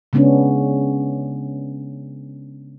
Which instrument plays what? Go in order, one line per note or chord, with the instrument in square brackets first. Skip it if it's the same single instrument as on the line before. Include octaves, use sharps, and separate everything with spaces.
[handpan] C#3 G#3 B3 C#4 D4